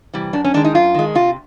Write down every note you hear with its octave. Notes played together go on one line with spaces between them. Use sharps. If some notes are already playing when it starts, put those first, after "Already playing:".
C3 E3 G3
F#2 D4
C#4
D#3 G#3 D4
D#4
F#2 F4
D#3 G#3
C3 F4